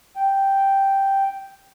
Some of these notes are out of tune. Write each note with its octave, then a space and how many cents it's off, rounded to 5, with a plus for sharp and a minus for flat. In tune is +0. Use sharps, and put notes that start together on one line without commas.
G5 -5